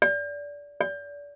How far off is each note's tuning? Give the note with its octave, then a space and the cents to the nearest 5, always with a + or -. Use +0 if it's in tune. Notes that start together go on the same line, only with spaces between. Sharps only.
D5 -20
D5 -30